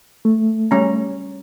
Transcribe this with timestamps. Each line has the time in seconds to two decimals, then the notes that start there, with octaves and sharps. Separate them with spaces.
0.25 A3
0.71 G3 C#4 A#5